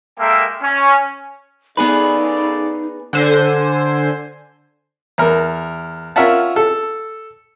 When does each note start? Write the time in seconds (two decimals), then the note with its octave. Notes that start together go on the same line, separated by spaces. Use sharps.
0.19 G#3 A#3 A4 A#4 E5 G5
0.62 C#4
1.77 C#3 B3 D#4 G#4 A4 B4 D5
3.13 D3 C5 G#5
5.18 E2 A#4
6.16 C#4 F4 A#4 E5 F#5 A5
6.56 A4